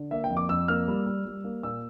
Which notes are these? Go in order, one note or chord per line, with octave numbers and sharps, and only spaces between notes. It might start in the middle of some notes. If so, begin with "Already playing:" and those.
Already playing: D3
A#3 E5
G5
F2
D6
F2 E6
A#3 F6
G3
G3
G3
A#3
A#2 E6